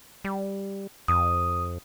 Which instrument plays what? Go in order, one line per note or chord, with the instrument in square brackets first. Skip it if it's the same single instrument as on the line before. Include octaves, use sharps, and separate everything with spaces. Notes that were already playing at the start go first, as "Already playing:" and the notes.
[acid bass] G3
[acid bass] F2 [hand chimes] D#6